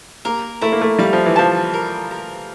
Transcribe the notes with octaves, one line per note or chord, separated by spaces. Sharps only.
A#3 A#4
A3 E4
A#3
A3
G3 F5
F3
E3
F3 A5
A#4
A#4